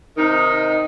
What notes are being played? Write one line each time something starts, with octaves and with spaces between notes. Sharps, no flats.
C3 D#3 D#4